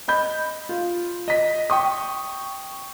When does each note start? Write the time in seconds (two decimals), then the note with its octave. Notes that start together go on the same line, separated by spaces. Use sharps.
0.08 D#5 B5 G6
0.69 F4
1.28 D#5 B6
1.70 G5 C#6 D#6